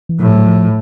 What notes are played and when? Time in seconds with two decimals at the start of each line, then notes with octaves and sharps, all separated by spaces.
0.09 E3
0.19 A2 F3
0.35 F#3
0.46 F3